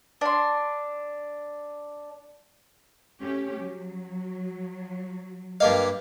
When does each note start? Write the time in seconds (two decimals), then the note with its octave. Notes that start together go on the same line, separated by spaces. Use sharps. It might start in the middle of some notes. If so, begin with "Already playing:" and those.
0.21 D4 C6
3.21 A3 C#4 G4
3.59 F#3
5.60 G2 A#3 D#5 F5